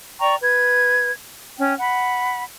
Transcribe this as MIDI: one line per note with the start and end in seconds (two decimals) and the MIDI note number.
0.20 0.35 74
0.20 0.35 79
0.20 0.35 82
0.20 0.35 85
0.40 1.11 71
0.40 1.11 92
1.58 1.74 61
1.58 1.74 79
1.79 2.44 78
1.79 2.44 83